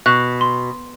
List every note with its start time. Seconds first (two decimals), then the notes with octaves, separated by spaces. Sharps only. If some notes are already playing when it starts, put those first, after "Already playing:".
0.06 B2 F#6
0.41 C6